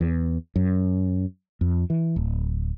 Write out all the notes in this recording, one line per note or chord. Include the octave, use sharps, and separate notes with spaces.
E2
F#2
F2
E3
D1